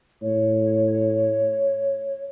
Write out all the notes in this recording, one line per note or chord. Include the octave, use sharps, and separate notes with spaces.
A2 C#5